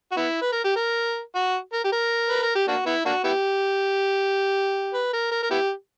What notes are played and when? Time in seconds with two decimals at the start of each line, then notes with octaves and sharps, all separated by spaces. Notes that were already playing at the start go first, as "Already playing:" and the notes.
0.12 F#4
0.17 B3 E4
0.42 B4
0.52 A#4
0.64 G4
0.76 A#4
1.35 F#4
1.73 A#4
1.84 G4
1.92 A#4
2.29 B4
2.42 A#4
2.55 G4
2.68 A#3 D4 F#4
2.86 B3 E4
3.05 A#3 D4 F#4
3.24 B3 E4 G4
4.94 B4
5.13 A#4
5.31 A#4
5.43 A#4
5.51 B3 E4 G4